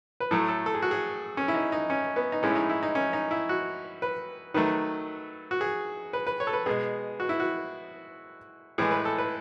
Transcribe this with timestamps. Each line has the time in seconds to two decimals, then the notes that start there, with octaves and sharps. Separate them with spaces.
0.20 B4
0.31 A2 F#3 A3 A4
0.48 A4
0.66 A4
0.75 G#4
0.82 F#4
0.91 G#4
1.37 C#4
1.48 E4
1.54 D#4
1.72 D#4
1.90 C#4
2.16 B3
2.32 D#4
2.43 A2 G#3 C#4
2.50 E4
2.56 D#4
2.70 E4
2.83 D#4
2.95 C#4
3.13 D#4
3.31 E4
3.49 F#4
4.02 B4
4.54 D#3 F#3 A3 B4
5.51 F#4
5.61 G#4
6.13 B4
6.27 B4
6.40 C#5
6.47 A4
6.53 B4
6.66 B2 G#3 G#4
7.20 F#4
7.29 E4
7.40 F#4
8.78 A2 E3 G#3 G#4
8.91 B4
9.05 A4
9.18 B4